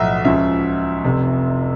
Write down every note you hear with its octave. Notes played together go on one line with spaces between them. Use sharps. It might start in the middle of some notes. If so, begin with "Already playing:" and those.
Already playing: B1 A2 F3 D#5 E5
C#2 C#3 F3 E5
F1 F2 C3